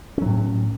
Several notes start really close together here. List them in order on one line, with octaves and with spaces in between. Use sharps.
C#4 F#3 A2